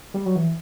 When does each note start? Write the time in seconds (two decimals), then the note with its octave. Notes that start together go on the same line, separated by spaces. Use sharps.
0.14 G3
0.26 F#3
0.36 E3